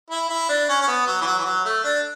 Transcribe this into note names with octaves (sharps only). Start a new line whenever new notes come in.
E4
E4
D4
C#4
C#4
B3
F#3
E3
F#3
E3
F#3
A3
D4